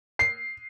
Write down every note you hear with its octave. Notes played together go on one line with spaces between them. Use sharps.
C7